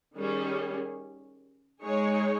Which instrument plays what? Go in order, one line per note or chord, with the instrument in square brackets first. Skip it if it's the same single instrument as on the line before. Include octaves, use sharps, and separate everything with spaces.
[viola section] D#3 G3 C#4 G#4
G#3 D#4 G#4 C#5